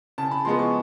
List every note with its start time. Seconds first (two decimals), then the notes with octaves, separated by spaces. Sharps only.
0.18 C#3 A5
0.31 B5
0.45 F3 G#3 B3 C6
0.59 C#6